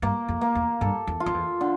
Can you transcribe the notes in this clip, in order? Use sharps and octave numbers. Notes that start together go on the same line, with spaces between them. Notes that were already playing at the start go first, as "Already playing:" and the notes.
G2 A#3
F2
A#3
E2
G2 A4
E2
F4
F2
E2
D3